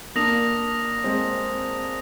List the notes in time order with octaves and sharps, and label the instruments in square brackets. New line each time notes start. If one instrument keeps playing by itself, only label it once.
[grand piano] A#3 D4 [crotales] D#6 A#6 F7
[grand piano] G#3 C4